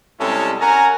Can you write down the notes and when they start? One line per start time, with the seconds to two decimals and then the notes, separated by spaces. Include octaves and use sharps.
0.20 C3 G3 G#3 C#4 E4 A4
0.60 C#4 A#4 F#5 G#5 A#5